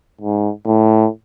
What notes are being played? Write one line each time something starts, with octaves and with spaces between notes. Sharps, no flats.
G#2
A2